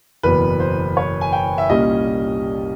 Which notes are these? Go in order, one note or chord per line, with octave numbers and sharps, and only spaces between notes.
F#1 E2 B2 B4
C5
C#5
G#5
G5
E5
C2 A#2 G3 A#3 C#4 D#5